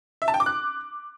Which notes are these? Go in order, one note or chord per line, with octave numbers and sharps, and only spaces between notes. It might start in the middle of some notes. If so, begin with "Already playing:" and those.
E5
A5
G5
D6
F#6